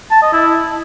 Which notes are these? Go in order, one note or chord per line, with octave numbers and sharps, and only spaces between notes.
A5
D#5
E4